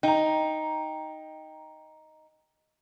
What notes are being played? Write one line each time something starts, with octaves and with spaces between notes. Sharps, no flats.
D#4 G5 A#5